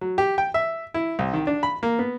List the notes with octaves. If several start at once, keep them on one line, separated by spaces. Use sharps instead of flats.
F#3
G4
G5
E5
E4
C2
D#3
D4
B5
A#3
B3